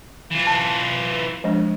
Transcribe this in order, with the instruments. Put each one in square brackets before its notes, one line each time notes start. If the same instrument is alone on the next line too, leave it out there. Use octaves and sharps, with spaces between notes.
[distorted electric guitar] E3 F4
[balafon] A5
F3 G#3 D4